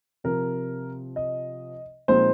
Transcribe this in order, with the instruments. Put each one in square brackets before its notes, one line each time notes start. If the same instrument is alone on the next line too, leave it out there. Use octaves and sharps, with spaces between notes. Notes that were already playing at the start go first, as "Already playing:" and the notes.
[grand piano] C3 F3 C4 A#4
D#5
A#2 F3 G#3 C4 D#4 C5